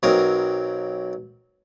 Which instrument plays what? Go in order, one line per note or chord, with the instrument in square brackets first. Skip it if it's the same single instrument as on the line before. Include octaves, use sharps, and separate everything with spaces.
[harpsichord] B1 F#3 C4 A#4 D#6